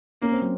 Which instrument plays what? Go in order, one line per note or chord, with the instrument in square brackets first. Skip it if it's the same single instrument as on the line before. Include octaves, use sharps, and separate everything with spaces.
[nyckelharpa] A#3 [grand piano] C#4
[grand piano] C4
F#3